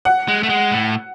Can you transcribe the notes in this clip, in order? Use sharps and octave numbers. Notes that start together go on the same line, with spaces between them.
F#5
G#3
A3
G#3
A2